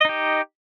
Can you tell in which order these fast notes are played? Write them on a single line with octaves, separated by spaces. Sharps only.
D#5 D#4 G4